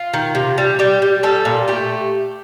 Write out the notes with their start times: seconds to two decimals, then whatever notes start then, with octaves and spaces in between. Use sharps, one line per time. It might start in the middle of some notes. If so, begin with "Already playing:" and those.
Already playing: F4
0.14 D#3
0.35 C3
0.58 G3
0.79 G3 G4
1.02 G3
1.23 G3 A4
1.45 A#2
1.68 A3 G4